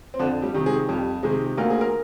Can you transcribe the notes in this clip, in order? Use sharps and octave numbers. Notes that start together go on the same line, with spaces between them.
C4
F2 D3 D4
G3 G4
C3 D#3
G#3 G#4
F2 G3 G4
C3 D#3 G#3 G#4
D2 A#3 A#4
G#4
A#4